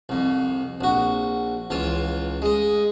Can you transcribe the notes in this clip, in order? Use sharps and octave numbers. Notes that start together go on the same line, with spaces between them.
C2 F2
A#1 F#4
C#2 E3 F4
G#3 D#5